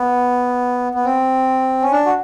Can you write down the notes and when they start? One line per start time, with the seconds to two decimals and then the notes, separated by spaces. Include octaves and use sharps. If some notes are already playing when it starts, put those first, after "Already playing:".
Already playing: B3
0.95 B3
1.05 C4
1.82 C#4
1.91 D4
2.06 F#4